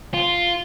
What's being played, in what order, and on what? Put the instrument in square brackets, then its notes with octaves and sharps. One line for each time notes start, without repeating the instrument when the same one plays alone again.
[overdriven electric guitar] F4